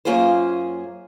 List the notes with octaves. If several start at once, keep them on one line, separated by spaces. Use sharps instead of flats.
F#2 A#3 C#4 F4 G#4 C5